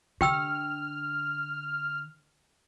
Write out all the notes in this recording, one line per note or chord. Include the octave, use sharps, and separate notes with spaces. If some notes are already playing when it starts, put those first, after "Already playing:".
D3 G4 G5 E6 F6